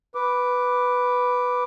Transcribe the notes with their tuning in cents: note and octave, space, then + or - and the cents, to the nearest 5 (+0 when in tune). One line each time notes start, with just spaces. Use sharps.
B4 +0 D6 +0